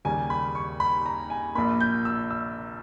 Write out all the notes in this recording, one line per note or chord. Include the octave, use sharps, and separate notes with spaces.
D#2 C#3 G3 A#3 G#5
B5
C#6
B5
A#5
G#5
A#1 A#2 A#3 B5
G6
E6
E6